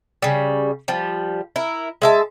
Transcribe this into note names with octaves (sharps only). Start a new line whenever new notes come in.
C#3 G3
F3 G3
E4 A#4
G#3 E5 A5